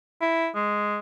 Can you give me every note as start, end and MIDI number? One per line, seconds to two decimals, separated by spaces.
0.21 0.48 64
0.55 0.99 56